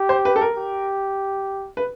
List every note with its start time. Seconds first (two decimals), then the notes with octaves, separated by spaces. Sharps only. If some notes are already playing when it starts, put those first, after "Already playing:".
Already playing: G4
0.09 C5
0.25 B4
0.36 A4
0.41 A#4
0.57 G4
1.77 B4